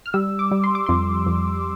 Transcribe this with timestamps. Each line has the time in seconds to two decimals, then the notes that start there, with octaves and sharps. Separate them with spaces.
0.06 F6
0.14 G3 E6
0.39 D6
0.51 G3
0.64 C6
0.75 D6
0.86 F2 C6
1.26 F2